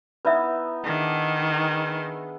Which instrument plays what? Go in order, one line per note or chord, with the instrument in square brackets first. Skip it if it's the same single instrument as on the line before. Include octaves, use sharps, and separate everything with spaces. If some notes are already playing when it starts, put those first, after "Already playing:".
[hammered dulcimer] B3 D#4 E4 [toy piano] B4 D5 E5
[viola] D#3 [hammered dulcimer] D4 G#4 A5